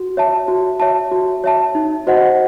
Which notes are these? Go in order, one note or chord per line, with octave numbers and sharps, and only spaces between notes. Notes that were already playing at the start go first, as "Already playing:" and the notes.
Already playing: F#4
C#5 E5 A5
F#4
C#5 E5 A5
F#4
C#5 E5 A5
D#4
F#4 C5 D#5 F#5